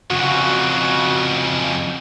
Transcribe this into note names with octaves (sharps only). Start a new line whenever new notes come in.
F2 C#3 F#4